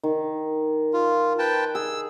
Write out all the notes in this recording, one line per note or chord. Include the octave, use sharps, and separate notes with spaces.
D#3
F4
B4 G5 A5
G#4 E6